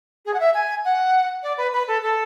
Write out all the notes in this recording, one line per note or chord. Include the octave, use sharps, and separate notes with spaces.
G#4
F#5
E5
G#5
F#5
D5
B4
B4
A4
A4